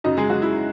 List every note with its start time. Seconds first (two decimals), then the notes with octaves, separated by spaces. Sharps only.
0.04 F#2 C#3 F#3 D#4 D#5
0.17 G#3 G#4
0.30 F#3 F#4
0.42 E4